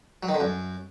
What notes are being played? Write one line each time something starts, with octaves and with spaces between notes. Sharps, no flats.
F#3
D#3
D3
F#2